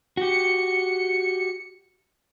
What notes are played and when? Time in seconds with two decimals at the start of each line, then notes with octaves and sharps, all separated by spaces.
0.17 F#4 G4 C#7